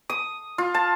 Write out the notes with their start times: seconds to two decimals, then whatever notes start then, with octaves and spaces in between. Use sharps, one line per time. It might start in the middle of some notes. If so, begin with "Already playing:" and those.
0.10 D#6
0.58 F4
0.74 A5